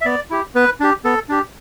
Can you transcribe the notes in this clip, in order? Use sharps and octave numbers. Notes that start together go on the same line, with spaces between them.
E5
B3 D5
E4 G4
B3 B4
D4 G4
B3 A4
D4 G4